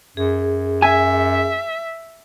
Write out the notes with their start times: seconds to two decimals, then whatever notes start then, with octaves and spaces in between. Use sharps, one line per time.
0.17 F#2 G#4
0.82 E5 G#5